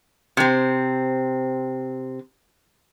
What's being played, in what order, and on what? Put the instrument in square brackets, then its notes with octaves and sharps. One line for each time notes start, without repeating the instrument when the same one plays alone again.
[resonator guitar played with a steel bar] C3 C4